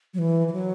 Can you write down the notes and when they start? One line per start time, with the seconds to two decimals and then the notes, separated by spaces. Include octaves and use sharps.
0.14 F#3
0.19 E3
0.48 E3
0.53 F#3